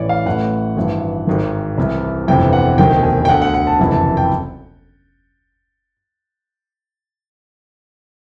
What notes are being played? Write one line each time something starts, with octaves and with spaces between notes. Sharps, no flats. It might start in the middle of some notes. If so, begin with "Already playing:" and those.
Already playing: A1 A2 E3 C#5 D5
F5
A1 A2 E3 F#5
G#1 G2 E3
G#1 G#2 D#3
C2 C3 E3
G1 F2 C3 E3 G5
F#5
E1 D2 C3 D#3 G5
G#5
G5
D2 D3 F#5
F#5
F#5
A5
F#1 F2 C3 E3
A5
G5